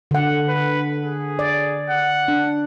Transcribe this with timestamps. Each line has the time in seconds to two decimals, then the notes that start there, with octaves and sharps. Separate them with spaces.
0.11 D3 F#5
0.48 B4
1.02 G#4
1.39 D5
1.90 F#5
2.28 D4